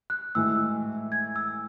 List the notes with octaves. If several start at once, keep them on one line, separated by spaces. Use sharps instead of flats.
F#6
A2 E3 G#3 E6
G#6
E6